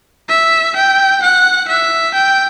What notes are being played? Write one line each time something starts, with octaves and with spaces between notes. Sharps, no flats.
E5
G5
F#5
E5
G5